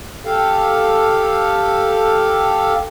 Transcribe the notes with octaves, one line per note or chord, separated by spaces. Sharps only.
G4 A4 F5